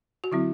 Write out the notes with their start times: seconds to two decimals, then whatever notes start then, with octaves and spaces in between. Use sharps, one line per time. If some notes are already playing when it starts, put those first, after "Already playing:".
0.24 F#4
0.32 D3 F#3 C4 E4